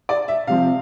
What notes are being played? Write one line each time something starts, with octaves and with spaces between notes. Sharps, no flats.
D5
E5
C3 F3 C4 F5